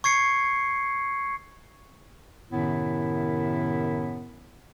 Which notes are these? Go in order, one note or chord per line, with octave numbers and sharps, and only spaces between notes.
C#6 G#6 C7 C#7
F#2 A2 C3 D#3 B3 E4